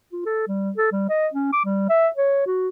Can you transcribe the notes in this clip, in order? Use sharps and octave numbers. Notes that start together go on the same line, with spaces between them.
F4
A4
G3
A4
G3
D#5
C#4
D6
G3
E5
C#5
F#4